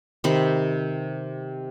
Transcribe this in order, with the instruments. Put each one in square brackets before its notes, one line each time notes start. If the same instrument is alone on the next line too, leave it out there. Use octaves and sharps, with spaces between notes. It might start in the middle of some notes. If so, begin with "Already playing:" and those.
[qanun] C3 D#3 C5 B5